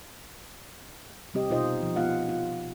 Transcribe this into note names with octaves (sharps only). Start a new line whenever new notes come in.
C3 G3 C4 G4 D#5
B2 D#4 F4 C5 D#5
F3
B3 F4 F5 F#5
F4